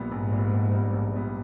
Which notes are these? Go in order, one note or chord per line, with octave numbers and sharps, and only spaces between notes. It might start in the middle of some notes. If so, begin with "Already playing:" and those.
Already playing: A#1 A#2 G3 B3
A#1 G#2
A#2 G3 B3
A#1
A#2 G3 B3
A#1
A#2 G3 B3